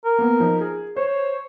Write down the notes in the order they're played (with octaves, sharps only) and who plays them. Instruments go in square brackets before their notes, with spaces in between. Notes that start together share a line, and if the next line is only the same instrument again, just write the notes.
[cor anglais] A#4
[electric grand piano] A#3 B3
F3 D#4
G#4
[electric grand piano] C5 [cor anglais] C#5